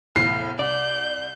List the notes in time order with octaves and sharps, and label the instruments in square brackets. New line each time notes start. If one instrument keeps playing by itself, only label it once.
[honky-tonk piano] F1 E2 A2 [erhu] F5 [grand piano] C7
[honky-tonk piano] C2 [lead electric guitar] D5 [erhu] G6